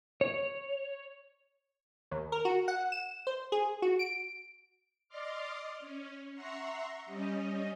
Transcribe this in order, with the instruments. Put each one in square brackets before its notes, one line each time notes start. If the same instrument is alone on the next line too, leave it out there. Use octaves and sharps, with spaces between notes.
[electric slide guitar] C#5
[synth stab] D#2
A#4
F#4
F#5
E7
C5
G#4
F#4
D7
[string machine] D5 D#5 C6 D6 F6
C#4
E5 F#5 A#5 C6 C#6
G3 C#4 D#5